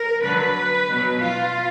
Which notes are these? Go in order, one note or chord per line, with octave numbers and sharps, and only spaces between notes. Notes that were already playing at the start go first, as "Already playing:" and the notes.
Already playing: A#4
D3 F#3 B4
B2 F#3
F4